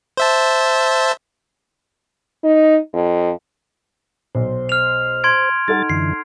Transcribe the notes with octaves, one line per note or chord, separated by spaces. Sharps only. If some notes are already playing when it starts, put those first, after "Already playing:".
C5 E5 A5
D#4
F2
B1 C5
F6 F7
C6 G#6 D7
G3 D#4 A4 F#5 A6
F#2 D3 E3 C7